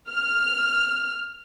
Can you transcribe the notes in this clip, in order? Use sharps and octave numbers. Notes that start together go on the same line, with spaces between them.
F6